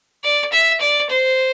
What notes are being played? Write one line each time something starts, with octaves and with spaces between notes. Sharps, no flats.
D5
E5
D5
C5